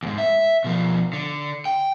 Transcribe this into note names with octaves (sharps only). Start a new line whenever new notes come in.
D#2 G#2
E5
B2 F3
D3
G5